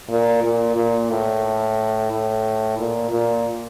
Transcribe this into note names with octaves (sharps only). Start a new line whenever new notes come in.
A#2
A#2
A#2
A2
A2
A#2
A#2